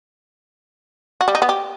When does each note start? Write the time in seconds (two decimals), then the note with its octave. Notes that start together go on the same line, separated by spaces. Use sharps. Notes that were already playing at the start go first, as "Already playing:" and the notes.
1.21 F#4
1.28 G3
1.35 D#4
1.42 B3
1.49 G4